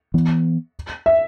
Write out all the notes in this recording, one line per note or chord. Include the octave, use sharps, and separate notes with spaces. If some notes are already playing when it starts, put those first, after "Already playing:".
E3 B3
E5